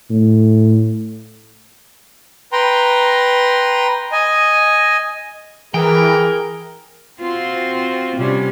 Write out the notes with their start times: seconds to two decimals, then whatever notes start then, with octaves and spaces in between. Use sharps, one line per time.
0.10 A2
2.52 B4 G5 A#5 C6
4.12 D#5 G#5
5.74 E3 G#4 A#4 G5
7.20 C4 F4 F#4
8.16 C3 G3 C#4